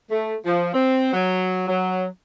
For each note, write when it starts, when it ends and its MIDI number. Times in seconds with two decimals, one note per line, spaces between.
0.10 0.35 57
0.46 0.69 53
0.74 1.12 60
1.13 1.65 54
1.68 2.05 54